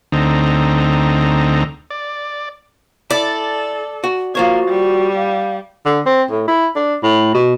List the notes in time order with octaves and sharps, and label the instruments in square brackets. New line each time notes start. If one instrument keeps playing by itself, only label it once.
[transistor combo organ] D2 D3 C4 D#4 A#5
D5
[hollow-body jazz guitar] E4 [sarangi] A4 [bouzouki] D5
[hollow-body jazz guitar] F#4
[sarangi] A#3 [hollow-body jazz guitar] F4 C5 C#5 [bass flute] F#4
[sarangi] G3
[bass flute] F5
[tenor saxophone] D3
C4
A2
E4
D4
A2
B2